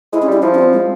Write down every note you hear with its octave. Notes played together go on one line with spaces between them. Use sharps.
G#3 E4
C#4
G3 E4
F3 E4
C#4
C4
G#3